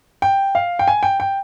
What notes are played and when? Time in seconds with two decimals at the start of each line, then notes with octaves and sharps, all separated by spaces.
0.22 G5
0.55 F5
0.79 G5
0.88 G#5
1.03 G5
1.20 G5